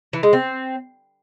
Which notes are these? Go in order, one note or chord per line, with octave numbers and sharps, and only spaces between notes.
E3
G#3
C4